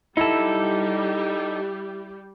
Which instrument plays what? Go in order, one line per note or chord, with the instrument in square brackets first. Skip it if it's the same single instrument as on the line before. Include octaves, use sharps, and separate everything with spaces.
[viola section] G3 G4 [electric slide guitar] D#4 A4 [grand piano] E4